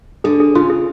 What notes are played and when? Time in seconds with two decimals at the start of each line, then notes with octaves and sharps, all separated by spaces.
0.24 D3 G#4
0.40 G#4
0.55 C#3 F4
0.70 G#4